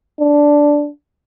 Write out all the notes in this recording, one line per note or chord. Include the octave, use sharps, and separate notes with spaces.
D4